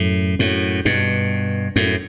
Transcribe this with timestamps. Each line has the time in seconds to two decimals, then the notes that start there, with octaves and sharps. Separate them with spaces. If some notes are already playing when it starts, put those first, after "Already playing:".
Already playing: F#2 A2
0.39 F#2 A2
0.85 G2 B2
1.76 F#2 A2